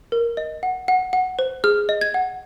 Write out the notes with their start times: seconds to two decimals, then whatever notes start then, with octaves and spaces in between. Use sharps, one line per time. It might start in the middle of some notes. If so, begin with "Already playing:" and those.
0.12 A#4
0.37 D#5
0.63 F#5
0.88 F#5
1.13 F#5
1.39 C5
1.64 G#4 F6
1.89 D#5
2.01 G#6
2.14 F#5